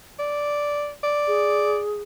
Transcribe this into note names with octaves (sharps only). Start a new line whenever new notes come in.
D5
D5
G#4